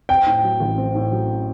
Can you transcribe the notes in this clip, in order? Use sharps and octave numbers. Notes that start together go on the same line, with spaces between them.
C4 G5
A2
F#3
A1
C4
A2
F#3